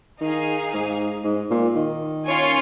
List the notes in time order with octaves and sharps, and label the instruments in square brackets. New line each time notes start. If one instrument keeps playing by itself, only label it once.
[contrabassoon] D#3 [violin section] D#4 G#4 F5 G#5
[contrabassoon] G#2
G#2
A#2
D#3
[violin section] C#4 F4 C#5 G#5